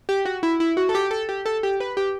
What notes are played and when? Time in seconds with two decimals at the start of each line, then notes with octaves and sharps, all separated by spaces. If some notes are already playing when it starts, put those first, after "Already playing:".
0.09 G4
0.25 F#4
0.43 E4
0.60 E4
0.77 F#4
0.89 A4
0.95 G4
1.11 A4
1.29 G4
1.46 A4
1.63 G4
1.80 B4
1.97 G4